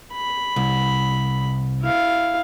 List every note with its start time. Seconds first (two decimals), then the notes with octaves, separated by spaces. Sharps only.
0.13 B5
0.56 C2
1.82 E4 F5